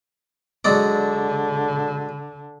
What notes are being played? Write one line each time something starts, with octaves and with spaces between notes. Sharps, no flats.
D3 F#3 G#3 D5